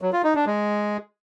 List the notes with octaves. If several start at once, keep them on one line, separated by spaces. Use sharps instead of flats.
F#3
F4
D#4
D4
G#3